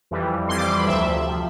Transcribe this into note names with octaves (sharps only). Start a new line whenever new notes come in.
F2 E3 G3
F2 E3 G3 C6
D6
C6
B5
D2 C3 F3 E5
C3 F3